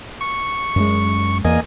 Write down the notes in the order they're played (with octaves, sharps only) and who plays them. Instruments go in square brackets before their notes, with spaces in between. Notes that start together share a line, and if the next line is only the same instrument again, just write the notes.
[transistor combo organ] C#6
[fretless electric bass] F#2 G#3
[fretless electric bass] E2 [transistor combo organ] A#3 D#5 G#5